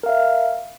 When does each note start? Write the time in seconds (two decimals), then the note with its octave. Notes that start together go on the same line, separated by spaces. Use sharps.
0.03 A#4
0.06 F5
0.09 E5